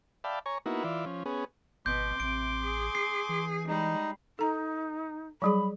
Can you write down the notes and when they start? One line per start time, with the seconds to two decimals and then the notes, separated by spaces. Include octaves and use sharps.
0.24 D5 E5 F5 G5 A5 B5
0.46 C#5 G#5 A#5 C#6
0.66 A#3 B3 D#4 E4 F#4
0.84 E3 F4 D5 E5
1.06 F3 C#4
1.26 B3 C#4 G#4
1.86 G#1 B2 C6 D6 G6
2.20 A1 C3 D7
2.64 G#4
2.95 C7
3.29 E3
3.68 G3 G#3 D#4
4.39 D#4 A4 A#5
5.42 F#3 G3 G#4 B5